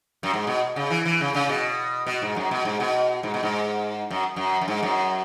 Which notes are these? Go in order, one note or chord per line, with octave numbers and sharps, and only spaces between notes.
F#2
G#2
B2
C#3
E3
E3
C#3
C#3
B2
B2
G#2
F#2
B2
G#2
B2
G#2
B2
G#2
F#2
F#2
F#2
G#2
F#2